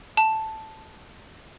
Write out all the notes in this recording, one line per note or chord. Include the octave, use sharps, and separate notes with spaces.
A5